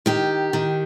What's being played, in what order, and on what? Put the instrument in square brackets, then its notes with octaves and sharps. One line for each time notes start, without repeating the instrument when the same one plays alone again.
[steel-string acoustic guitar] D#3 G4
D#3